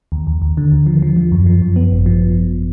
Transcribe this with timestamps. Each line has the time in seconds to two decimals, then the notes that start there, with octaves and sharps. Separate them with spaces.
0.12 D#2
0.27 D#2
0.42 D#2
0.57 D3
0.72 D#2
0.86 F3
1.02 F3
1.16 F3
1.32 F#2
1.46 F3
1.62 F#2
1.76 B3
1.92 G#1
2.06 F3